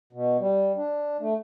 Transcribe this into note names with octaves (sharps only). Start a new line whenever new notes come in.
B2
G3
D4
A3